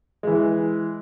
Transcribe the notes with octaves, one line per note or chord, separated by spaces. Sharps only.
E3 G#3